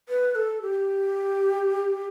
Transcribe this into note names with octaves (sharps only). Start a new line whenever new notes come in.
B4
A4
G4